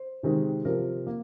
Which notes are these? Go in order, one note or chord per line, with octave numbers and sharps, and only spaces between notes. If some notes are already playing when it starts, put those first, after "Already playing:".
Already playing: C5
C3 D#3 G#3 C4
C3 F3 C4 A#4
A#3